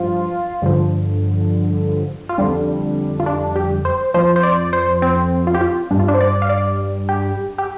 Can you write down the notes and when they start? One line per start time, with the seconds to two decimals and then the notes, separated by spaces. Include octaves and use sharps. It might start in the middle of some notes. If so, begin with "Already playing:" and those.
Already playing: G2 F3 F4
0.62 G2 D3 F3
2.29 F4
2.38 F2 D3 G3 D4
3.20 F4
3.26 D4
3.56 G4
3.85 C5
4.14 F2 F3 C5
4.36 C5
4.43 D5
4.73 C5
5.02 C4
5.47 F4
5.54 G4
5.61 F4
5.91 G2 G3 D4
5.99 F4
6.08 D4
6.14 C5
6.21 D5
6.42 F5
6.49 D5
7.09 G4
7.58 G4